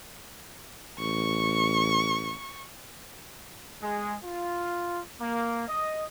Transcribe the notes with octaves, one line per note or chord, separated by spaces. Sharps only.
A1 C#6
G#3
F4
A#3
D#5